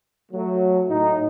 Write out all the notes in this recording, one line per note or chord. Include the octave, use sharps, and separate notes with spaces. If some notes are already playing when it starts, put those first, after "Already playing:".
F#3 A3
A2 D#4